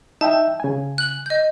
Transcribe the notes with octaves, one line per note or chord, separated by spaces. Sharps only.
D#4 E5 G5 A5
C#3 G#5
F#6 F#7
D#5 G6